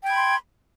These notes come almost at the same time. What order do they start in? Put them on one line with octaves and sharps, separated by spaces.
G5 G#6 B5 C6